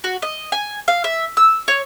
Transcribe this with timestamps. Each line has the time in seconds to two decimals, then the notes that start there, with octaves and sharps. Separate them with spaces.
0.04 F#4
0.22 D#5
0.52 G#5
0.88 F5
1.04 E5
1.37 E6
1.68 C#5